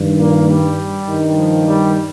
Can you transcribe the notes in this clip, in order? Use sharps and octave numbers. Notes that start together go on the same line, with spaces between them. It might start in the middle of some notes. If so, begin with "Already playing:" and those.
Already playing: G2 D#3
A#2 A#3
G3
G2 D#3
F3
G3